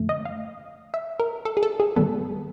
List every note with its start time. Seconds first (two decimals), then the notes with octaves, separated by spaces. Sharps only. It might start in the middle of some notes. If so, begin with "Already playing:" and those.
Already playing: F#2 D3 F3 A3
0.09 D#5
0.25 F5
0.94 E5
1.20 A#4
1.45 A4
1.57 G#4
1.63 A4
1.80 G#4
1.96 G#2 D#3 G3 B3 A4